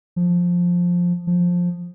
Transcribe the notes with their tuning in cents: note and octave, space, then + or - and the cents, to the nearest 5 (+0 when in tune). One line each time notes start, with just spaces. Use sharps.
F3 +10
F3 +15